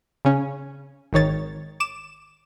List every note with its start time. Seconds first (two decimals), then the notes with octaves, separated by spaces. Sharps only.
0.25 C#3 C#4
1.13 G#1 D#3 C#5 A6
1.80 D6 E7